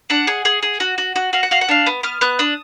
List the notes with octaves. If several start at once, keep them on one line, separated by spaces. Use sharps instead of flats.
D4 F#5
G#4
G#4
G#4
F#4
F#4
F#4
F#4 F5
F#5
F#4 F5
F#5
D4 F5
B3
B3 F6
B3 F#6
D4 D#6